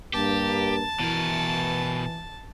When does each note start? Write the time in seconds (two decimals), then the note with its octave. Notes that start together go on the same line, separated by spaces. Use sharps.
0.14 G2 A#3 G4 A5
1.00 B2 E3 A#4